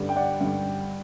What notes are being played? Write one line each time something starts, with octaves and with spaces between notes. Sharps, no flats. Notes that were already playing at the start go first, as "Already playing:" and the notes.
Already playing: G2 D3 G3
G5
D5 F#5
G2 D3 G3